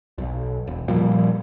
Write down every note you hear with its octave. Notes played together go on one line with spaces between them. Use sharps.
B1
E1
A#2 F3 G3